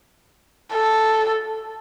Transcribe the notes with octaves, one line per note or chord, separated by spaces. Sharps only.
A4